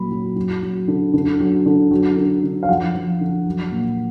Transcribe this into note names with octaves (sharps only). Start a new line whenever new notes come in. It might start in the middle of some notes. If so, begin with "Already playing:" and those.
Already playing: A#2 F#3 B5
F#3
F#3
F#3
D3
D3
F#3
D3
F#3
D3
D3
F5
F3 F#5
F3
D3
F#3
A#2